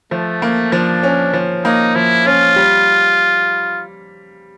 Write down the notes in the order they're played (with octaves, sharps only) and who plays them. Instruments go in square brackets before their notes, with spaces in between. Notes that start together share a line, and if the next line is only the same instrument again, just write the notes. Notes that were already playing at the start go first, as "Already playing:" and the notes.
[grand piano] F3 [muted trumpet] A3
[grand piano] A#3
[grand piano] F3 [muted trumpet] D4
[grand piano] C#4
F3
[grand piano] A#3 [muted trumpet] D#4
[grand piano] F3 [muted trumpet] E4
[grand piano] C#4 [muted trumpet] F4
[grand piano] G3